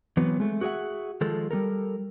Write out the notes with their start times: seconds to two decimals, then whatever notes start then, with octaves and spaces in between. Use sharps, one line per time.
0.17 E3 F#3 B3 C4
0.40 G#3 A3
0.61 F#4 G#4 A#4 E5 F#5
1.21 D#3 F3 G#3 A4
1.51 G3 G#3 A4 A#4